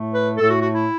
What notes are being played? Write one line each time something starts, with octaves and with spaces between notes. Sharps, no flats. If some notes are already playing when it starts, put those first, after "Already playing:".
Already playing: A2 A3
B4
A2 A3 A4
F#4
F#4
E4